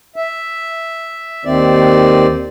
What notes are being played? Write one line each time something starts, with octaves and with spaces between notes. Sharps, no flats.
E5
D#2 D#3 C4 D5